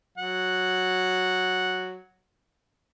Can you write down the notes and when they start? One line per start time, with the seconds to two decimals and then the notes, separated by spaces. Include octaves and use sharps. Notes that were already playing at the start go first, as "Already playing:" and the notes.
0.18 F#3 F#5